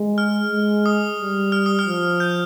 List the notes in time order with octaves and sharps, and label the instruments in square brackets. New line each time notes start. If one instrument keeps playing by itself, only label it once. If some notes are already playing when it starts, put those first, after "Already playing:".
Already playing: [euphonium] G#3
[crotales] F6
[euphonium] G#3
[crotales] D#6
[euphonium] G3
[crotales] F6
D#6
F6
[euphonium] F3
[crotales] G6